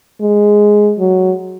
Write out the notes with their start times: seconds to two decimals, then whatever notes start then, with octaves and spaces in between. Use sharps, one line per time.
0.21 G#3
0.99 F#3